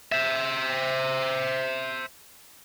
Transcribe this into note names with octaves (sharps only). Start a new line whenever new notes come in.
C5 E5